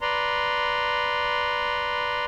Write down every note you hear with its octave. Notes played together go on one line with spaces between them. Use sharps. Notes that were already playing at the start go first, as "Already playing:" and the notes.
B4 D5 A#5 C6